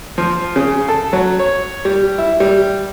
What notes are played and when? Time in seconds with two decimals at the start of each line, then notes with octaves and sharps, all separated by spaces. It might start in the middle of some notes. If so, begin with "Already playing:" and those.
0.18 F3
0.56 C#3
0.88 A4
1.13 F#3
1.39 C#5
1.85 G3
2.18 E4
2.40 G3